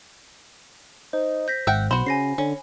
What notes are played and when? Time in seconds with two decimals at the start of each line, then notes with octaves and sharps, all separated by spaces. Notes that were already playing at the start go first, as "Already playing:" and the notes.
1.13 D#4 C5
1.48 G6 A#6 B6
1.67 G#1 E5 F#5 G5
1.91 B1 F#4 C5 B5
2.06 C#3 G#5 A#6 C7
2.38 D3 C#4